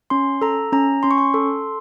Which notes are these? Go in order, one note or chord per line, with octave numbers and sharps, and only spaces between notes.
C#4 C6
A4 A#5
C#4 A#5
C#4 C6
C#6
C6
A4